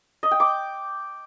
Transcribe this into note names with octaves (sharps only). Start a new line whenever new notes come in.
D#5
G5
D6